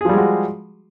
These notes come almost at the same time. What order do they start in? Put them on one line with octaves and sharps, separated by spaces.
G#4 F3 G3 G#3 F#4